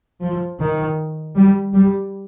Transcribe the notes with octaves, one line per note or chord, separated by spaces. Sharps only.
F3
D#3
G3
G3